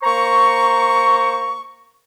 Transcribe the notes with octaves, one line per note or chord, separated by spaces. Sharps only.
A#3 C5 A#5 C#6